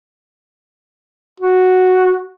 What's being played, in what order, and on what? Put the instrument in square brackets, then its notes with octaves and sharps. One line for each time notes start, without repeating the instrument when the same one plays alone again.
[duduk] F#4